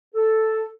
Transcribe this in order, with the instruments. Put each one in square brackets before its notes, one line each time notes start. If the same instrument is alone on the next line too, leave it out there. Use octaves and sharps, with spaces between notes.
[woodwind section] A4